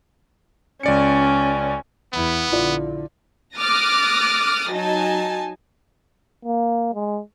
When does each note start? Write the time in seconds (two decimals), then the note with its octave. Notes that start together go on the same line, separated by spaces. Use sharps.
0.83 C#2 C#4 D5 C#7
2.13 E2 B3 E4
2.52 A#1 D3 E4 F4 D5
3.57 D6 D#6 F6 F#6 A6 A#6
4.70 F#3 D#4 G#5 A5
6.45 A#3
6.94 G#3